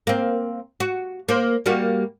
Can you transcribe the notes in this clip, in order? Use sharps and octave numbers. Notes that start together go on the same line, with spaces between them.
A#3 C4
F#4
A#3 C5
G3 A#3 F#4